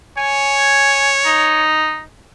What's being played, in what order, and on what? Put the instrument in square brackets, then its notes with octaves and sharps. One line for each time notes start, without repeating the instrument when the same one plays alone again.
[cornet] C#5 [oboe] G#5
[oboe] D#4